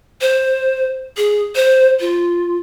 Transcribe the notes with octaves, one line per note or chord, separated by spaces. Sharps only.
C5
G#4
C5
F4